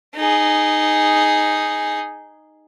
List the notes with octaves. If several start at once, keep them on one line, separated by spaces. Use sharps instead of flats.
D#4 G#4